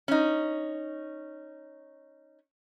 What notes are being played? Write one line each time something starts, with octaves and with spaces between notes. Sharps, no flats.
C#4 D#4